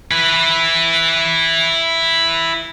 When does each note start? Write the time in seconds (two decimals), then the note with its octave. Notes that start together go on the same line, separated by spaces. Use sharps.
0.11 E4 B4